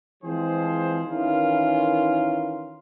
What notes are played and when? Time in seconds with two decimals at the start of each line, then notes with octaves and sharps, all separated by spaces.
0.23 E3 F3 G#3 C4 G#4 C5
1.06 D#3 E3 C#4 E4 F4 A#4